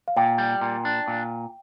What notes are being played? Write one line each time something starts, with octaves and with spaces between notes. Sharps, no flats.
F5
A#2 G5
G3
A#2
D4
A#2